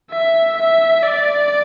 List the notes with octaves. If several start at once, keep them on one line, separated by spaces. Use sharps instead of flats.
E5
E5
D5